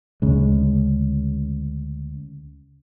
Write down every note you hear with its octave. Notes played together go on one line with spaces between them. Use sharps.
D2 C#3 G#3